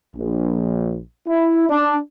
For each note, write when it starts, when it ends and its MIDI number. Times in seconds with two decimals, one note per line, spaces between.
0.16 0.96 34
1.27 1.66 64
1.69 1.96 62